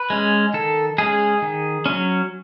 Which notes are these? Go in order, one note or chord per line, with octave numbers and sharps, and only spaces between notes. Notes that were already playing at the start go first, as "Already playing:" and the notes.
Already playing: B4
G#3 C#4
D#3 A4
G#3 C#4 G#4
D#3
F#3 C#4